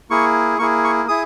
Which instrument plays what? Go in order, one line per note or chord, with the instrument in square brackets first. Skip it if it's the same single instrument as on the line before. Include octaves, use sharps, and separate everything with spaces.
[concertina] A#3 E4 G#4 C#6
A#3 E4 G#4 C#6
C#6
E4 G#4 D#6